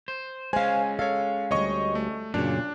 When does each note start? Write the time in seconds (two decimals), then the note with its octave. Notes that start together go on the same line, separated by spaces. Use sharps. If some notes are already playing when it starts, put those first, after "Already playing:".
0.08 C5
0.53 G#3 C#4 C5 F5 G#5
0.99 A4 C#5 F5
1.51 D2 G3 C#5 D#5 C#6
1.95 A3
2.34 F#2 A#2 C#3 D4